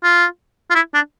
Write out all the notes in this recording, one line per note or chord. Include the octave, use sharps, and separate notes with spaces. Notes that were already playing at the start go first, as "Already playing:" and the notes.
F4
F4
E4
D4